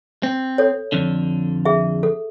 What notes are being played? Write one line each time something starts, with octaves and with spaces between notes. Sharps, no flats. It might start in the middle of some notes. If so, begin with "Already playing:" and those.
C4
A4 C#5
F2 D3
G#4 E5
A4